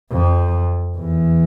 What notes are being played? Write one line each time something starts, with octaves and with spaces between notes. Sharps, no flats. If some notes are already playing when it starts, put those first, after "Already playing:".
F2
E2